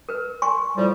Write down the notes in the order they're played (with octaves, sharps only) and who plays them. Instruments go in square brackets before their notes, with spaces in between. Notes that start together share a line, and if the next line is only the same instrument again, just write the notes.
[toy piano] A#4 B4
G#5 C6 C#6
[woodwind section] A2 F3 G3